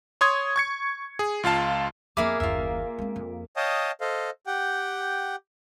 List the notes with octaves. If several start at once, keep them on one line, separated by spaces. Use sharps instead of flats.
C#5 C6 D#6 G#6
C#6 G#6 C#7
G#4
C#2 F4 F5 A5
F2 A#3 B3 G#4 E5 B5 D6
F#1 D#2 F4 E5
G#3 C4
F2
C#5 D#5 F5 G5 A5 D#6
A4 C5 D#5 F5
G4 F#5 G5